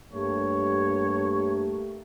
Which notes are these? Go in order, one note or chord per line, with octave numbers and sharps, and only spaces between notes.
G2 A3 A#3 G4 C#5